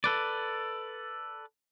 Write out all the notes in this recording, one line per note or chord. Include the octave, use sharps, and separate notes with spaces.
A4 B4 D5